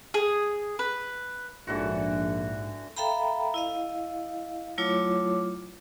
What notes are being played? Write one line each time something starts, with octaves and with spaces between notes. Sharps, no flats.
G#4
B4
A#1 G#2 D3 E3 F#4
A4 E5 F5 G5 A#5 B5
E4 D#5 F5
F#3 A3 E4 F4 C#5 D6